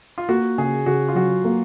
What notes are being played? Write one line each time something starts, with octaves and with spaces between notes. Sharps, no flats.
F4
A#3 F#4
C#3 G#4
C#3 F#4
F4
F#3 F#4
A#3